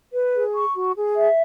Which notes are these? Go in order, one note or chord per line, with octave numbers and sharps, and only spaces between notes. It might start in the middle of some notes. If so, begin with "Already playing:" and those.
B4
G#4
C#6
F#4
G#4
E5